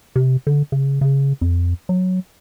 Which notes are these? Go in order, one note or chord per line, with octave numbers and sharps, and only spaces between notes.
C3
D3
C#3
C#3
F2
F#3